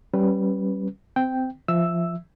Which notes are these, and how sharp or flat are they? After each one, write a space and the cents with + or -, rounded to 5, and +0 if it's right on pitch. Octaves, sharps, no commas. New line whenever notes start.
G3 -25 C#4 -25 B4 +0
C4 -20 G5 +0
F3 -15 E5 +0 E6 +0